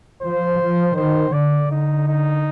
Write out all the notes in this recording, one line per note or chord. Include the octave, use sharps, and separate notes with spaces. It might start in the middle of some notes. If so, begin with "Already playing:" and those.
F3 C5
F3
D#3 C5
D3 D5
D3 D#4
D#4